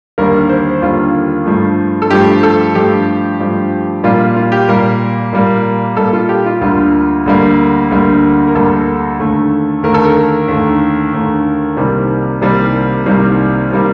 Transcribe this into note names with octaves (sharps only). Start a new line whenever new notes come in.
D#2 D3 G3 A#3 A#4
C5
D#2 D3 G3 A#3 F4
G2 F3 A3
A4
G2 F3 A3 G4
A4
G2 F3 A3 G4
G2 F3 A3
A#2 G3 A#3 F4
F4
G4
A#2 G3 A#3 A#4
A#2 G3 A#3
A#2 G3 A#3 A4
F4
G4
F4
D2 D3 G3 A#3 F4
D2 D3 G3 A#3
D2 D3 G3 A#3
A#4
D2 D3 G3 A#3 A4
D#2 D3 A3
D#2 D3 A3 A#4
A4
A#4
D#2 D3 A3
D#2 D3 A3
C2 C3 D#3 G3 A#3
C2 C3 D#3 G3 A#3 C5
C2 C3 D#3 G3 A#3
C3 D#3 G3 A#3